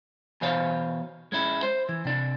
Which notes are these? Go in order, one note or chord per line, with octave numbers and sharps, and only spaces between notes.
B2 E3 C5 C#5 F5
G#3 C#4 E4
C5
E3
C3 D4